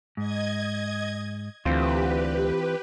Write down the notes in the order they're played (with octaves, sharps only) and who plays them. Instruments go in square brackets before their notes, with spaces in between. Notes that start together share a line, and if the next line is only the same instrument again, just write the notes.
[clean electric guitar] G#2 [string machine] D#5 G#6
[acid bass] D2 [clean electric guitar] E3 C4 F4 [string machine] G4 B4